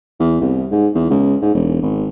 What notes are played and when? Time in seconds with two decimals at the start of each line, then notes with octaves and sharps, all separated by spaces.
0.20 E2
0.40 C2
0.72 G#2
0.95 E2
1.10 C#2
1.42 G#2
1.54 E1
1.82 G#1